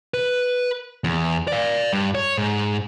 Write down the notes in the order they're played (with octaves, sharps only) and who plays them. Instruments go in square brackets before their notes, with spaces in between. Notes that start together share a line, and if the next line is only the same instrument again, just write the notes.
[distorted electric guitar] B4
E2
D5 F5
G2
C#5
G#2